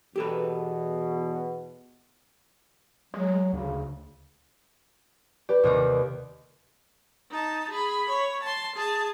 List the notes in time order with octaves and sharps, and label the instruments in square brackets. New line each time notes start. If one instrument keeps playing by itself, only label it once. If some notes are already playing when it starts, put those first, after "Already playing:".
[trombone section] E2 B2 [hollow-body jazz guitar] G4 A4 B4
[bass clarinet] F#3 [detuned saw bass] G#3
[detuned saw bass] D2 [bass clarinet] C#3
[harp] G4 [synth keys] B4 D5
[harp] D#2 C3 A#4
[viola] D#4 A5
G#4 B5
C#5
A5 C6
G#4 A5